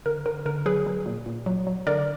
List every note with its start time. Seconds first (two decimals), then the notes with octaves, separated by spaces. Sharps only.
0.06 D3 A#4
0.26 D3 A#4
0.46 D3 A#4
0.66 F#3 G#4 B4
0.86 F#3
1.06 A#2
1.26 A#2
1.46 F#3
1.67 F#3
1.87 D3 A#4 D5